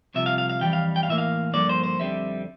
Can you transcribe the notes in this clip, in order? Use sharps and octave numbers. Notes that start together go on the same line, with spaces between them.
C2 C3 F3 E5
F5
F5
F5
F2 E3 G3 G5
F5
G5
F5
A2 E3 A#3 E5
F5
G2 D3 F3 A#3 D5
C5
C5
F2 D3 G3 C4 E5